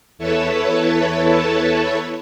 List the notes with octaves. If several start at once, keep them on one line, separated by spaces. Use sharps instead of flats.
E2 E4 A4 B4 C#5 A5